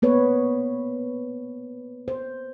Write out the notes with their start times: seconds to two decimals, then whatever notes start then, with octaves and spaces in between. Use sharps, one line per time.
0.02 A#3 B3 B4 C#5
2.08 C5